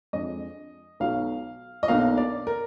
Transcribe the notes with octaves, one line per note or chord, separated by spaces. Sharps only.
F2 F3 G#3 D4 D#5
B1 B2 F#3 F5
D#5
B1 B2 A#3 D4 F5
D5
A#4